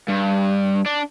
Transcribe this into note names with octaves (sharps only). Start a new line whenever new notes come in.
G2
D4